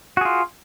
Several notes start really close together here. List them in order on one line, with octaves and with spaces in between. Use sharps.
F#4 G#4 F4